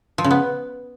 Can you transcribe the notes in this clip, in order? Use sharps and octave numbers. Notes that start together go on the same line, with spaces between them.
F3
C#3
B3